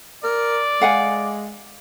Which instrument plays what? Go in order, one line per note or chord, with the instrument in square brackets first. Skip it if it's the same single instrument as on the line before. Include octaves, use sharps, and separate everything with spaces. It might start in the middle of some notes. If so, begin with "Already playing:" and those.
[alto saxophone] A#4 [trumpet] D5
[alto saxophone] G#3 [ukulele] F5 F#5 G#5